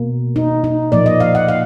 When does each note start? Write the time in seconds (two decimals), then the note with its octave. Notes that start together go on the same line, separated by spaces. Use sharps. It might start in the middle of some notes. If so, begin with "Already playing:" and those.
Already playing: B2 A#3
0.36 D#4
0.64 D#4
0.92 A#2 F3 A#3 D5
1.06 D#5
1.20 F5
1.35 F#5
1.48 F5